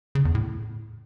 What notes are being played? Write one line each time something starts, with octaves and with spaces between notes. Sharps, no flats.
C#3
E2
A2